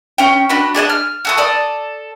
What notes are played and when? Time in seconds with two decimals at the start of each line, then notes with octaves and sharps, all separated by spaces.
0.18 C#4 G5
0.49 D4 F#4 D#5 B5
0.75 D4 G#4 D#5 A5
0.89 F6
1.25 F#4 A4 D#6
1.37 A4 D5 D#6